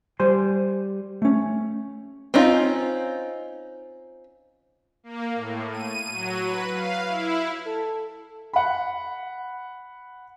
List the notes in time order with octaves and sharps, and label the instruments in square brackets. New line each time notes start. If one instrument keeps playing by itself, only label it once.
[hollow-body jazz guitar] G3 C5 G#5 C6
A3 C#4
[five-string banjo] C4 C#4 D#4 F4
[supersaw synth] A#3
A2
D#7
F#3
B4
F5
E4
[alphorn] A4
[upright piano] F#5 B5